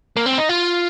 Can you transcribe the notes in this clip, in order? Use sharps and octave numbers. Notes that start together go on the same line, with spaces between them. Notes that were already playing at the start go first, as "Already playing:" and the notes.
A#3
C4
D#4
F4